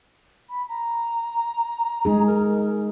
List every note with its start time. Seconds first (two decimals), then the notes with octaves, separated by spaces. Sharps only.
0.49 B5
0.69 A#5
2.05 G#3 D#4 G#4
2.27 A#4